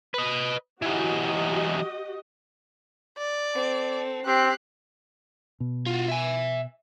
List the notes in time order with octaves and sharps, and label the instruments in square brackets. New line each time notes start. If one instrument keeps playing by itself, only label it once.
[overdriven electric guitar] B4 D#5
[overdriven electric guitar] E3 F#3 [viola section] F#4 G4 D#5
[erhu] D5
[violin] C4 A4
[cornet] C4 [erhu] G4 [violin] F#6 C7
[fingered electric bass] B2
[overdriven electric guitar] F4 F#4
E5 G#5